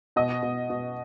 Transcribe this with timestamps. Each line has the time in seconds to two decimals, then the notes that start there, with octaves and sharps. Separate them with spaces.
0.16 B2 D#5
0.42 B2
0.70 B2